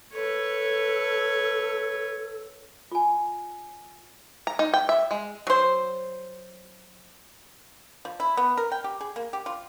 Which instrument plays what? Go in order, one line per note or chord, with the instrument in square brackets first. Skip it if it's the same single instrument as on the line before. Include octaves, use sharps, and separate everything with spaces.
[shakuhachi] A4 [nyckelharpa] B4 C#5
[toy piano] F4 G#5
[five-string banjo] A#5
D#4
G5
E5
G#3
[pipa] F#3 C5
F3
E4
B3
A#4
G5
G4
G#4
A#3
G4
F4